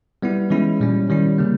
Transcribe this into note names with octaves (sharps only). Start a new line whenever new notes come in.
G3 B3 E4
E3 G#3 C#4 E4
A#2 G3 C#4
D#3 G3 C#4 E4
C#3 G3 A#3